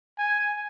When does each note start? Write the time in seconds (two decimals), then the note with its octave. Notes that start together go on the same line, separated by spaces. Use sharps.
0.18 G#5